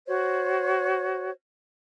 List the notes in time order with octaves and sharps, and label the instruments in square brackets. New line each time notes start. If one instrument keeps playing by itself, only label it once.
[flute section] F#4 C5 C#5